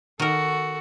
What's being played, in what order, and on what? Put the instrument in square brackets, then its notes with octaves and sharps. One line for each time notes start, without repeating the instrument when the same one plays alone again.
[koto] D#3 A#4 [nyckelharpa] F#4 A4